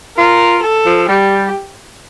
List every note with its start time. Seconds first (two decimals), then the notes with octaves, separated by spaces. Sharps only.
0.17 F4 A#4
0.63 A4
0.86 F3
1.08 G3 G4